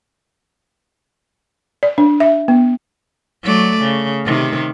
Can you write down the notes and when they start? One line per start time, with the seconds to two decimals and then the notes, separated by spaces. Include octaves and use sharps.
1.83 D5
1.98 D4
2.20 E5
2.48 B3
3.43 F#3 A3 D5
3.82 C#3
4.25 C3 D#3